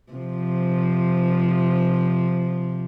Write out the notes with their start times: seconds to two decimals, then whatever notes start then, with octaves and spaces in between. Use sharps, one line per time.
0.13 C3 F3